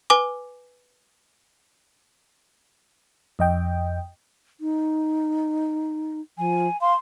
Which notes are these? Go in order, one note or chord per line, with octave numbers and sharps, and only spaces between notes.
B4 G#5 D6
F2 D#5 G5
D#4
F3 G#5
F5 C6